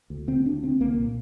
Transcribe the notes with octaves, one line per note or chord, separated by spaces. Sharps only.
D2
D3 C4
D2 D4
D3 C4
C2 A#3
A#2